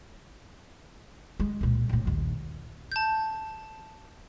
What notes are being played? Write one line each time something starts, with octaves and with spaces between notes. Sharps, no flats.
G#3
C#2 A#2
A#1 A2
A#1 D#2
A5 G6